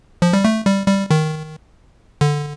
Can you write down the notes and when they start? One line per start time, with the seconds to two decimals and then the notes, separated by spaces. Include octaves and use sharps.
0.22 F3
0.33 G3
0.45 A3
0.66 G3
0.88 G3
1.11 D#3
2.21 D3